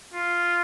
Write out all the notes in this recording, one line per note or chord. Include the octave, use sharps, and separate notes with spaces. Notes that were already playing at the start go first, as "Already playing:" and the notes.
F4